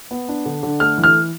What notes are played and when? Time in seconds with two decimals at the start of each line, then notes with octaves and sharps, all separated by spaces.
0.11 B3
0.29 D4
0.46 D3
0.63 D3
0.80 A3 F6
0.98 E3
1.04 F6